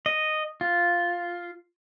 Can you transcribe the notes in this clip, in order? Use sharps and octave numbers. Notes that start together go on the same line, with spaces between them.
D#5
F4